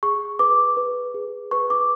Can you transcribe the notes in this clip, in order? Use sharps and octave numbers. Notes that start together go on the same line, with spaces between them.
G#4 C#6
B4 D6
B4
G#4
B4 C#6
D6